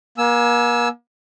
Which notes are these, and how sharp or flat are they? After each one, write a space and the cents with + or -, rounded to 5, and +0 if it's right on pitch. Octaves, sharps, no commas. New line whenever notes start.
A#3 +40 G#5 +30 E6 +0